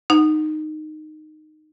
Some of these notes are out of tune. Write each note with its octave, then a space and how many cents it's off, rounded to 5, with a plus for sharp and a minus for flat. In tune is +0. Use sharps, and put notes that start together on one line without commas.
D#4 -15 F#5 +0